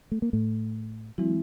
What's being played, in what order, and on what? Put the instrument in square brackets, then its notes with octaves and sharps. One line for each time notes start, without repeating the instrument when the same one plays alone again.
[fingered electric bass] A3
A#3
A2 A3
[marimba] E3 G#3 C4 E4 [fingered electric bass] F#3